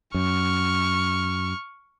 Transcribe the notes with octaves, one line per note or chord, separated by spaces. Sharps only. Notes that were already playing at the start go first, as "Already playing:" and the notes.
F#2 C#6 F6